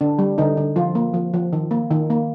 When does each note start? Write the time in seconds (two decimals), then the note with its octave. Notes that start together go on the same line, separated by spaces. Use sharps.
0.01 D3 D4
0.19 G3
0.38 D3 D#4
0.57 D3
0.76 F3 F4
0.95 A#3
1.14 F3
1.34 F3
1.53 D#3
1.71 A#3
1.91 D#3
2.10 A#3